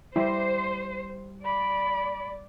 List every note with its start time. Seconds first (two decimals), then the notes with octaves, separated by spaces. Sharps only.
0.16 G3 E4 C5 D6 A#6
1.45 D5 B5